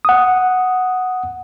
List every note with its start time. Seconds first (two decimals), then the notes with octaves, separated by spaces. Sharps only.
0.05 F#5 D#6